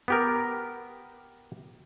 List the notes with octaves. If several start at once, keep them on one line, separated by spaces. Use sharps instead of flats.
B3 G4 A#4